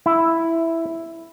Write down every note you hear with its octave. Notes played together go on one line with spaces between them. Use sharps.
E4